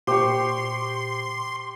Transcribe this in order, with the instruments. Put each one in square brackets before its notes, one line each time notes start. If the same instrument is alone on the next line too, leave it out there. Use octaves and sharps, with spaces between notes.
[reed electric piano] A#2 C5 G5 [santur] G4 C#6 [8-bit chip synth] C6